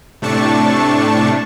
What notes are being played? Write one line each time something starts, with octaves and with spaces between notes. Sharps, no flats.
A2 C3 A3 D4 A5 C#6